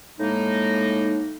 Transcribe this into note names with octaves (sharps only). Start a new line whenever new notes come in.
A2 G#3 A#3 D#4